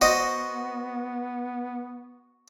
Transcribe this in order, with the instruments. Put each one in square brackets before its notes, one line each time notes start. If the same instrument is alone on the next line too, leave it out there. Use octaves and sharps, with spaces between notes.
[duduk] B3 [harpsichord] F#4 C5 D#5